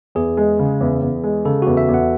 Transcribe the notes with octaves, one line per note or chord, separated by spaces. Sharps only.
E2 G#4
G#3
C#3
E2
E2
G#3
C#3 A4
E2 F#4
E5
E2
F#5